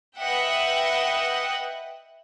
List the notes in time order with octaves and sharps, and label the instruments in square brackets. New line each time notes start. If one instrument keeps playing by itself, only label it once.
[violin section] B4 D#5 E5 F#5 G5